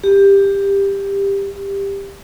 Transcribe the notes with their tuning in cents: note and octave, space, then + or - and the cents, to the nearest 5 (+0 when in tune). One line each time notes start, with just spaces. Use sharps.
G4 +15